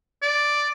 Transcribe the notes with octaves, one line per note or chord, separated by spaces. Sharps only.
D5